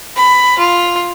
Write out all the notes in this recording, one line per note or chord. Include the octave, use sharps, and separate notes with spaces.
B5
F4